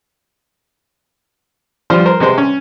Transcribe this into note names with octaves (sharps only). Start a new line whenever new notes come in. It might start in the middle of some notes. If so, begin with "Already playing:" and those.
F3 G3 F4 C5
A#4 C5
C3 G#3 C5
C#4